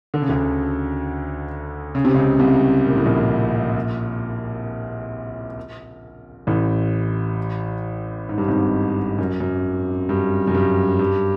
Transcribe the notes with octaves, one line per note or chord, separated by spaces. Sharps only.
D3
C#3
D2 D3
C#3
C3
C#2 C#3
C2 C3
A#2
A2
A#1 A#2
A1 A2
G#2
G2
G#1 G#2
F#2
F#2
G2
F#2
G2
G2